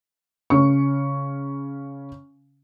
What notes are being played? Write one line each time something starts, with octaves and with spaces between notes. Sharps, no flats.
C#3 C#4 C#6